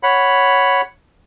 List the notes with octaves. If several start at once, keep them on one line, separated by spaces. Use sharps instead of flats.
C#5 F#5 B5